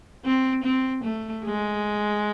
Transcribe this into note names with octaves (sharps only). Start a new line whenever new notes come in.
C4
C4
A3
G#3